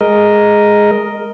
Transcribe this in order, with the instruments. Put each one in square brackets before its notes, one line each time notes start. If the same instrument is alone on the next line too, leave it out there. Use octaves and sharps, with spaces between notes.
[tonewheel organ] G#3 A#4 D#5